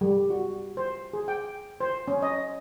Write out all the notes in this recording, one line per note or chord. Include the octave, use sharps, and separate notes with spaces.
G3
F#4
C5
G#4
G5
C5
C#4
D#5